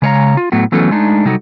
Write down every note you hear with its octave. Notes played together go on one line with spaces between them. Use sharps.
C#3 G#3 C#5 D5 F5 A#5
F4
A2 F#3 A3 B3
E3 F#3 A3 B3 C#4 A4
G#3 A3 D4 D#4
C3 F#3 G3 D#4 F#4 A4